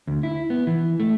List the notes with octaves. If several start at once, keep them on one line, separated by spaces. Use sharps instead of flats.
D2
E4
B3
E3
A3